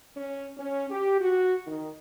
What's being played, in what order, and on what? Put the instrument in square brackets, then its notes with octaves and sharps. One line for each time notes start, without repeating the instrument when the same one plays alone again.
[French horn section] C#4
C#4
G4
F#4
D#3